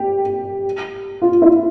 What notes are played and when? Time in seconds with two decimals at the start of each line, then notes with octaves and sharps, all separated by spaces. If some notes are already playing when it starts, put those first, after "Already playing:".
Already playing: G4
1.22 F4
1.42 E4